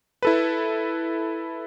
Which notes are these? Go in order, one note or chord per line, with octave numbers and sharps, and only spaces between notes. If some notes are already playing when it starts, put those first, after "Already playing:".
E4 A4 B4